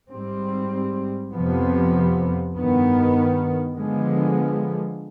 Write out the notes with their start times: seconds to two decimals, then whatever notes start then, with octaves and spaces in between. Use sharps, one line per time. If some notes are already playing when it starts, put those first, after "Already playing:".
0.12 G#2 G3 C4
1.33 F2 C3 F3 B3
2.56 G2 D#3 B3
3.78 D3 F3 G#3 B3